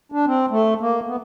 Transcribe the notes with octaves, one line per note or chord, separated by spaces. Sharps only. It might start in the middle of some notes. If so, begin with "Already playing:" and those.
D4
C4
A3
A#3
B3